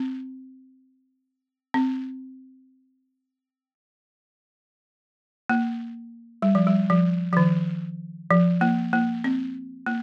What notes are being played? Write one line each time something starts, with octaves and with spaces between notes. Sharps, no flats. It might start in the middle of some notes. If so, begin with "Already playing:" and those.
Already playing: C4
C4
A#3
G3
F3
G3
F3
F3
D#3
F3
A#3
A#3
C4
A#3